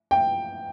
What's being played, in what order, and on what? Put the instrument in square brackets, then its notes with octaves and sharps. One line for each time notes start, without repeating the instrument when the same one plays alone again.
[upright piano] G5